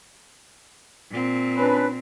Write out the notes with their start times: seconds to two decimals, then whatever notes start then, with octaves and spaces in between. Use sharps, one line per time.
1.12 A#2 C4
1.57 C#4 D4 B4